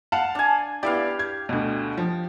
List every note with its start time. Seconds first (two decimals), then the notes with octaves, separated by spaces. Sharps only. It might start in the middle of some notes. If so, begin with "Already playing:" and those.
0.12 F5 F#5 A5
0.35 D4 G#5
0.83 B3 E4 G4 D5 F5
1.19 G#6
1.49 D2 B2
1.97 F3